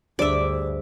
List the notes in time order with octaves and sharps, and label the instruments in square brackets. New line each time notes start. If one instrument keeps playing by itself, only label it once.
[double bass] D2 [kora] G2 [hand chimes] G#4 C5 [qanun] D5 E5